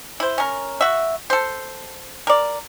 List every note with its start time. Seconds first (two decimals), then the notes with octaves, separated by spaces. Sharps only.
0.20 E4 C5
0.38 C#4 A#4
0.81 F#4 E5
1.30 A4 C5
2.27 A#4 D5